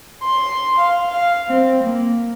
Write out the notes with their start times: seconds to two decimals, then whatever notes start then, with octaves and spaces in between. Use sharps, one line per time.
0.24 C6
0.78 F5
1.09 F5
1.49 C4
1.83 A#3